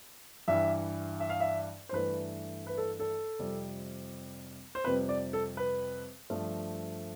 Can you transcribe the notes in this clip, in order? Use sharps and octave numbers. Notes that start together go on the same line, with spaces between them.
G2 E3 G3 E5
E5
F5
E5
C5
G2 E3 A3 B4
B4
A4
A4
F2 C3 G3
C5
F2 C3 G3 B4
D5
A4
B4
G2 F3 A3